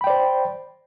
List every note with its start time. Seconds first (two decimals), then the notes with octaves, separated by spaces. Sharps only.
0.01 B5
0.04 G5
0.07 D5
0.10 C5